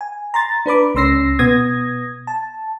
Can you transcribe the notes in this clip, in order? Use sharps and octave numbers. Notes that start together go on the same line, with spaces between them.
G#5
A#5 C6 A6
D4 B4 B5 D6
C#2 C#4 C6 E6 A#6 C7
B2 B3 D#6 G#6 A#6
A5